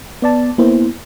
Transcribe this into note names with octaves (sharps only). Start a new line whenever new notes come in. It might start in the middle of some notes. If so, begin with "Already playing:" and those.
B3 D5 A5
A#3 B3 E4 C5